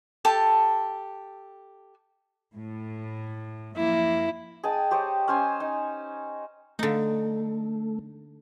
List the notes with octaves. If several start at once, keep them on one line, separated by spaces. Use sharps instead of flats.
G4 A4 A5
A2
F#2 F3 A#3 E4
G#4 D#5 G5 A5
G4 C5 C#5 D#5
C#4 C5 G#5
D#4
D3 A3 D#4